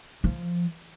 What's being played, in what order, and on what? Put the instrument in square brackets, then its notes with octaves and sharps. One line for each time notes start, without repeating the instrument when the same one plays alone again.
[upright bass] F3